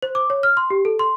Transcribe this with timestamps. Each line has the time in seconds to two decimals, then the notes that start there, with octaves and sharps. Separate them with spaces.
0.02 C5
0.15 D6
0.30 C#5
0.43 F6
0.57 C6
0.70 G4
0.85 A4
0.99 C6